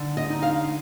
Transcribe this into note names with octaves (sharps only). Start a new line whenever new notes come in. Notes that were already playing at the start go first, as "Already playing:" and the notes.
Already playing: D3 D#4
D#5
D#4
F5